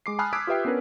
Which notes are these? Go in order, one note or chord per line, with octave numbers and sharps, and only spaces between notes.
G#3 D6 C7
G#5 A5 B5 D#6 F6 F#6
D6 E6 F#6 G#6 B6 D7
F4 G4 B4 E5 G5 C7
B3 C#4 D4 A#4 B4